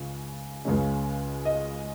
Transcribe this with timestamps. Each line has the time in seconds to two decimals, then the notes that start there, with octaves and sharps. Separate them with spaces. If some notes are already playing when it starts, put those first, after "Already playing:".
Already playing: C#2 C#3 C#4
0.65 C#2 C#3 G#3 C#4
1.45 D#5